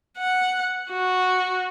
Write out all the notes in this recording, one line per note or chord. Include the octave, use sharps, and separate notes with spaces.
F#5
F#4